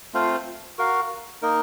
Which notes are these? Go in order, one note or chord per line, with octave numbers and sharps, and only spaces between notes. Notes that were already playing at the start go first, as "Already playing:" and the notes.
A3 C4 F4 C5 F5
F#4 A#4 F5
A#3 D#4 A#4 D#5